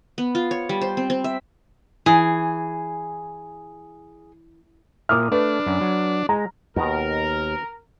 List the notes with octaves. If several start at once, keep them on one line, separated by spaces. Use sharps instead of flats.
B3
F4
C#5
G3
C5
C4
C4
E5
E3 G#4
A#2 A#4 E5 D6 D#6 F6
A3 D4 B4
F#2
F#3
G#3 A#5
D#2 B2 D#3 A#4